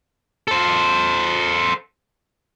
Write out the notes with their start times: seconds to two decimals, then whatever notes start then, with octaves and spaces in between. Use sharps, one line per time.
0.48 A4 C5